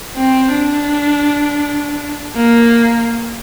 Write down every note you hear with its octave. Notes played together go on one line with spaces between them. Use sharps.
C4
D4
A#3